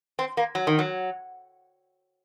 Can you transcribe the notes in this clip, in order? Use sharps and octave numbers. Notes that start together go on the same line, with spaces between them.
C4
A#3
F#3
D#3
F#3